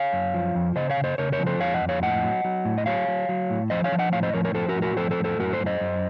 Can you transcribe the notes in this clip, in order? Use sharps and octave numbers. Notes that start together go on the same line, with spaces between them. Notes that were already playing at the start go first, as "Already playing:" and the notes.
Already playing: C#5 F5
F#2
F3
F2
C#3 C5 D#5
C#5 F5
C#3
C5 D#5
C#3 A#4 C#5
A#4 C#5
F3
A4 C5
F2 C#5 F5
D#5 F#5
F2
C#5 F5
A2 D#5 F#5
F#3
F#3
A2
D#5
F#3 C#5 F5
F#3
F#3
A2
F3 C5 D#5
C#5 F5
F3
D#5 F#5
A2 C#5 F5
C5 D#5
F3 A#4 C#5
A#4 C#5
F3 A4 C5
F#4 A#4
A2
F#4 A#4
F3 A4 C5
A4 C5
A2
A4 C5
F#2 F#4 A#4
A4 C5
F#2
C5 D#5
F#2